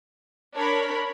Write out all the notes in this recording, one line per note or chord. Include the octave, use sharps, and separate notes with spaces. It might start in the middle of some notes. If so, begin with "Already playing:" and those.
D4 A#4 C#5 B5